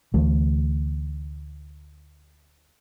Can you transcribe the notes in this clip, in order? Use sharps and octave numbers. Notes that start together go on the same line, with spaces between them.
D2 E3 A3